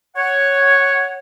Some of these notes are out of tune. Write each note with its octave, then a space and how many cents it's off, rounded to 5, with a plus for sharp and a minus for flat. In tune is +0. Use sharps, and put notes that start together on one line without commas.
C#5 +0 F#5 +0